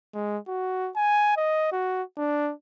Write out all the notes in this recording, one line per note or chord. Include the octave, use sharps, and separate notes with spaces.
G#3
F#4
G#5
D#5
F#4
D4